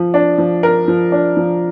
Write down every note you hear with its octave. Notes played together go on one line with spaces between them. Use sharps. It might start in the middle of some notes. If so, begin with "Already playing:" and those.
Already playing: F3
D4
F3
A#4
F3
D4
F3